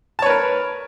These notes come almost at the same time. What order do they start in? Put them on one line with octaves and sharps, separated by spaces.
A5 C#5 B4 A#4